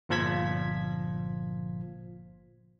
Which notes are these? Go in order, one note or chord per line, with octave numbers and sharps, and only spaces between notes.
G1 A#2 F3 F4 G#6 B6